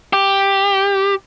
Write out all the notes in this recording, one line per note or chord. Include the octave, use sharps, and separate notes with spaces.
G4